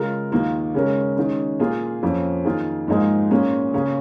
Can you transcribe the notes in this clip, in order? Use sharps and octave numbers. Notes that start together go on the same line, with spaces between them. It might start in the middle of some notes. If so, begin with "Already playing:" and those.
Already playing: C#3 G#3 F4 A#4
D#2 D#3 A#3 F4
C#3 G#3 C#4 A#4
D#3 G#3 C#4
A#2 A#3 F4 G#4
F2 F3 A#3 C#4
D#3 A#3 F4 G#4
G#2 F3 A#3 D#4 G#4
A#2 A#3 C#4 G#4
C#3 A#3 C#4 G#4